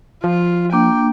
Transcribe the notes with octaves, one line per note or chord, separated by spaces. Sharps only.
F3 F4
A#3 D4 G5